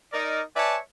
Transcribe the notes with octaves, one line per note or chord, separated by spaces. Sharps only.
D#4 A#4 D5
B4 C#5 D5 E5 G#5 A5